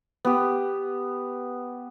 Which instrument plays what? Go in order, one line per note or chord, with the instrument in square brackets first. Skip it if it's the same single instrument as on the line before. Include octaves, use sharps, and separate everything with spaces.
[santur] B3 G4